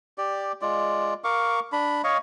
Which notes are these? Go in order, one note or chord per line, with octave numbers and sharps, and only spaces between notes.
G4 D5
G#3 F4 D5
A#4 F5 C#6 D6
D4 B5
C#5 D#5 F5 C#6